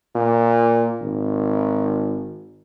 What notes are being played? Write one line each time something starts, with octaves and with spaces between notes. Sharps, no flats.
A#2
G#1